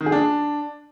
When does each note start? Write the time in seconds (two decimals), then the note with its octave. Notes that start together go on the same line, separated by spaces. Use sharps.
0.01 D#3
0.06 G#4
0.12 D4